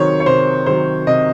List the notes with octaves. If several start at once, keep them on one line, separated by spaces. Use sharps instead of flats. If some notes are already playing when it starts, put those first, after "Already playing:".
Already playing: C3 D#3 F#3 C5 C#5
C#5
C3 C5
D#3 F#3 C5
C3 D#5